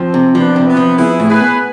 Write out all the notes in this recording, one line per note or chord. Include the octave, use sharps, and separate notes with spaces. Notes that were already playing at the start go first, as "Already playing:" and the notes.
Already playing: F3 C4
C3
F3 B3 D4
C3
B3
F3
B3 E4 G#4
A2
G#4 B4
B3